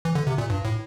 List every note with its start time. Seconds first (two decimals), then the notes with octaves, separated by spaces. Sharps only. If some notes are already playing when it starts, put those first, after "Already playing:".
0.05 E3
0.15 D3
0.27 C3
0.38 A#2
0.50 G2
0.65 A2